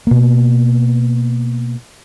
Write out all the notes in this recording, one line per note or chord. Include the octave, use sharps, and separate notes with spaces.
B2 A#3